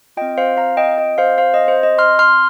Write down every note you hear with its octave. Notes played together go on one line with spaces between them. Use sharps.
C4 F4 D#5 G5
C5 F5
F5 A#5
D#5 G5
D#5
C5 F5
C5 F5
D#5
C5
D#5
C6 F6
C6 F6